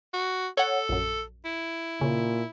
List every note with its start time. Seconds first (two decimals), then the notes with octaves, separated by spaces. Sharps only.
0.14 F#4
0.57 A4 C#5 F#5
0.89 A#1 F#2
1.45 E4
2.01 A#2 C#3